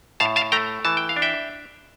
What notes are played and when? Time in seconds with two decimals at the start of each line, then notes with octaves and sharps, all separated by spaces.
0.20 A2 F5 A5
0.36 F5 A5
0.52 A3 G5 A#5
0.85 E3 A5
0.97 G5
1.09 F5
1.16 D4
1.22 E5 G5